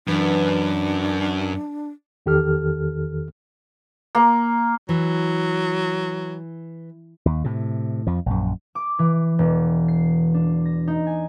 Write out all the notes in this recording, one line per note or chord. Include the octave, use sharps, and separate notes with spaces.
F#2 E3 D4 B4
E2 D#3 G4 A4 F6
A#3
E3 F#3
D#2
A2 C3
F2 F3
A#1 F#2
D6
E3
E1
C7
D4
A#6
D#4
G#5